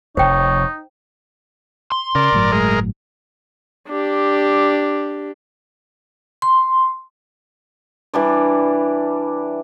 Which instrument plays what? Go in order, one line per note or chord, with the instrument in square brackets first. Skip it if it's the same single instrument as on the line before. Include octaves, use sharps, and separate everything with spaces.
[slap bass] F1 F2 [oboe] D#4 [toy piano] C5 G5 [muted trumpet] C#5
[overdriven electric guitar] C6
[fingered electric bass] C#3 [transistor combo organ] A#4 D5
[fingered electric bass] G1 A2 F#3
[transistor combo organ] G#3 A#4
[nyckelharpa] D4 G4
[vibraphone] C6
[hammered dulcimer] E3 G3 D4 D5